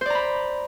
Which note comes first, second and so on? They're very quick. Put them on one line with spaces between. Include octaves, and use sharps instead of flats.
C5 D5 A#5 B5